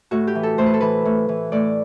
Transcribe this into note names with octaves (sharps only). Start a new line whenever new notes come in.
A2 F#4
G4
E3
A4
A2 C5
B4
A4
E3 B4
A2
E3
A2 D5